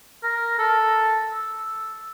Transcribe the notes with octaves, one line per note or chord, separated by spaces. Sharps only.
A#4
A4
E6